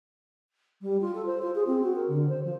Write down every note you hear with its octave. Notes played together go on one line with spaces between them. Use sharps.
G3
F4
A4
C5
F4
G#4
C4
F#4
A#4
D3
C5
F3